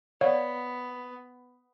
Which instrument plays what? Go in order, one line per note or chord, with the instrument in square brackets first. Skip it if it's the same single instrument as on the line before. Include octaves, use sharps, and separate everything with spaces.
[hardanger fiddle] B3 [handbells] C#5 [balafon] D5 F5 F#5